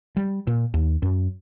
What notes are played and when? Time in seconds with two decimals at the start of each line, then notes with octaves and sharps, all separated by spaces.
0.17 G3
0.47 A#2
0.74 D#2
1.02 F#2